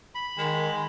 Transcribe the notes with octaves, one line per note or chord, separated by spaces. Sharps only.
B5
D#3 G#3